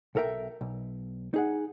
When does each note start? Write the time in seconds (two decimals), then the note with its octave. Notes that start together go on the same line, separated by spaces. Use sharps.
0.15 B1 A4 A#4 E5 G5
0.61 B1
1.34 D#4 G#4 F#5